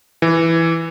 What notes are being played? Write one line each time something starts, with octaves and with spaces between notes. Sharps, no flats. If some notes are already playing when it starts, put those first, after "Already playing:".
E3